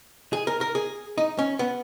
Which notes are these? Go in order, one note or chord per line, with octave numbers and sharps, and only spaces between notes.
G#4
A#4
A#4
G#4
D#4
C#4
B3